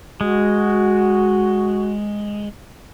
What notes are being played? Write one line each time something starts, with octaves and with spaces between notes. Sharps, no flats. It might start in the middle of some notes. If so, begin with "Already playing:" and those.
G#3 F#4